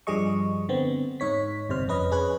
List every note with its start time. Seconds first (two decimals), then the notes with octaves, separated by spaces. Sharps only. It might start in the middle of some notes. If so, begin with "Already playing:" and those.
0.07 G2 F3 G3 G#4 D#5 C#6
0.69 D3 B3 C4
1.20 G#2 D#4 C#5 B6
1.69 G1 C3 C5 F6
1.88 F2 C#4 B4 D#5
2.11 C#4 G#4 B4 C#5 F#6